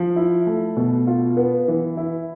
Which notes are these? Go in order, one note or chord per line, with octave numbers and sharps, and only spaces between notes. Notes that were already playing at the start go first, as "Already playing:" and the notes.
Already playing: F3
E4
A3
B2
F4
B3
E3
E4